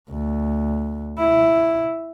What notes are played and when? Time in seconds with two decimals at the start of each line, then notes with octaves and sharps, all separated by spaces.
0.10 D2
1.18 E4